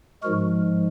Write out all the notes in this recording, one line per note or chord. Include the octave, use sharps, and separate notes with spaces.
G#2 F3 G#3 F#4 A#4